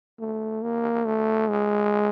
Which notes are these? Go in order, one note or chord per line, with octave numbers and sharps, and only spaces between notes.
A3
A#3
A3
G#3